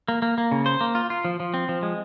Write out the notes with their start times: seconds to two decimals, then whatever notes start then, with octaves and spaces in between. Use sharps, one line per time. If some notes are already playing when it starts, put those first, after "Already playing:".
0.08 A#3
0.22 A#3
0.38 A#3
0.52 C#3
0.66 C5
0.81 A#3
0.95 F4
1.10 F4
1.25 F3
1.40 F3
1.54 C4
1.69 F3
1.83 G#3